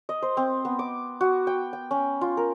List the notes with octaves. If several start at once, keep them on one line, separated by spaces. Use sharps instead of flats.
D#5
C5
C4
B3
D6
F#4
G5
G5
C#4
F4
A#4